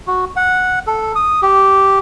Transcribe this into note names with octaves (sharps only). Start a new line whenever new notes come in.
F#4
F#5
A4
D#6
G4